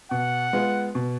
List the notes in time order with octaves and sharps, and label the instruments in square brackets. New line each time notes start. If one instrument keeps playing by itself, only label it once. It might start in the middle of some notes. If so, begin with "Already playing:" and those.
[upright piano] B2 [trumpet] F#5
[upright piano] G#3 B3 F4
B2